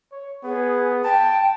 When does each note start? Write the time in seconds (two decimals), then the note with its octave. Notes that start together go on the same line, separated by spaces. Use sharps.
0.12 C#5
0.44 B3 G#4
1.04 G5 A5